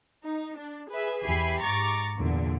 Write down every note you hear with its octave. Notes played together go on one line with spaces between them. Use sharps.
D#4
D4
G#4 B4 E5
E2 G4 E5 G#5 B5 C7
G#2 A#5 C#6 D6 A6
E2 A#2 D3